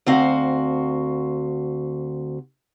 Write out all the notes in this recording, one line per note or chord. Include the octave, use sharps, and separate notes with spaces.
D2 C4 F#4 F5